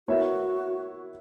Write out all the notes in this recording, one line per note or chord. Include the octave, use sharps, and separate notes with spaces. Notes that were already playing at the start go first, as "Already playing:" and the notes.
B3 E4 F#4 A#4 C#5 E5